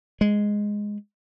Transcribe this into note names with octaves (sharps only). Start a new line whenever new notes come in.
G#3